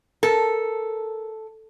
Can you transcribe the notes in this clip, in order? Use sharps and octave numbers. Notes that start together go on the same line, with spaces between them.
A4 A#4